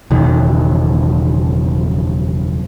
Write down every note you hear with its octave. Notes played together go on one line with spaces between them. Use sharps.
F#1 E2 B2 D#3